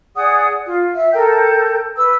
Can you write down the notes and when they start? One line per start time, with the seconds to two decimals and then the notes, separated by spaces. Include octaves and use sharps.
0.15 G#4 D5 F#5 D#6
0.65 F4
0.94 E5
1.12 A4 A#4 G5 G6
1.96 B4 E6